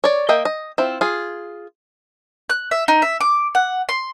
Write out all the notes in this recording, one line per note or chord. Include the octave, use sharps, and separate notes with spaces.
C#5 D5
A#3 D#5 E5 G5
D#5
C4 E4 F4
F4 G#4
F#6
E5
D#4
E5
D6
F#5
C6